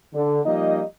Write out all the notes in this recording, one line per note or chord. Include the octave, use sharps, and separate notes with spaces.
D3
F3 G3 A#3 D#4 D#5